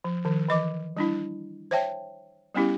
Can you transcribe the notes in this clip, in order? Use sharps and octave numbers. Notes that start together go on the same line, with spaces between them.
F3
D#3 F3
E3 D#5 D6
G3 D4 E4
C5 C#5 E5 G5 A5
G3 B3 C#4 E4 G4